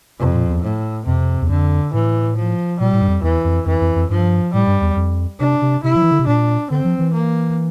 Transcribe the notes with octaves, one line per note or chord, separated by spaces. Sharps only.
F2 C3
A#2
E2
A2
F2 C3
E2
F2 D3
A2 E3
F3
A#2 G3
A2
G2
F2
E2 E3
F2
F2 E3
F2
F2
G2 F3
A2 G3
G2
E2
F2
C3 D4
C3
C3 E4
F3
E3
D3
C3
A#2 D4
D3 C4
F3
E3
A#3